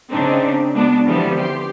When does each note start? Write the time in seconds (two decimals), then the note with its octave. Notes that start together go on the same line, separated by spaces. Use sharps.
0.11 C#3 C4 D4 D#4
0.74 G#3 B3 D4 F#4
1.05 D3 E3 F3 G3 B3 C4
1.36 G4 C6